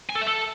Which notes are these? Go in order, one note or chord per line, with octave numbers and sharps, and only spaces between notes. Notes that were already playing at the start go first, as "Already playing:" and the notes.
G#5
A4
E5
A4